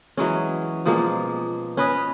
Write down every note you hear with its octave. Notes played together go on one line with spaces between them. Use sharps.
E3 F#3 G#3 C#4
B2 F3 G#3 A#3
C#4 B4 D#5